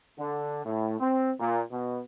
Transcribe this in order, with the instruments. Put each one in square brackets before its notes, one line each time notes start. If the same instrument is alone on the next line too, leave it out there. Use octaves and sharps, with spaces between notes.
[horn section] D3
A2
C4
A#2
B2